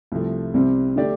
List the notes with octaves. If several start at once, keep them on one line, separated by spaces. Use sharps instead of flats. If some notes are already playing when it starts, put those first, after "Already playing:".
C2 C3 F3 A3
C2 C3 G3 C4
D3 A3 D4 G4 D5